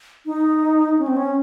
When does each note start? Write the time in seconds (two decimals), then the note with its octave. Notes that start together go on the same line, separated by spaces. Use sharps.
0.26 D#4
0.99 C#4
1.07 C4
1.17 C#4